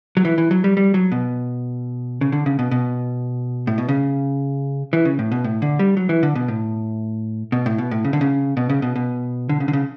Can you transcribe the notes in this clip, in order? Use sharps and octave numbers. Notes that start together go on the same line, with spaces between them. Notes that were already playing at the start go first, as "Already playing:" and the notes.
F#3
E3
E3
F#3
G3
G3
F#3
B2
C#3
D3
C#3
B2
B2
A2
B2
C#3
E3
C#3
A2
B2
A2
D3
G3
F#3
E3
D3
B2
A2
B2
A2
B2
A2
C#3
D3
C#3
B2
C#3
B2
B2
D3
C#3
D3
C#3